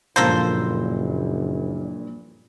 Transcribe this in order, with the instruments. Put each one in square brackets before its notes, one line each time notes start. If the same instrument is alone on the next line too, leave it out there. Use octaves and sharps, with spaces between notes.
[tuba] F#1 [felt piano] G2 A#2 F3 [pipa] A#3 A4 C5